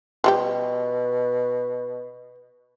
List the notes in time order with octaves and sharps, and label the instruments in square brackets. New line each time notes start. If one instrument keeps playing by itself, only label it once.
[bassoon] B2 [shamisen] F3 G3 G4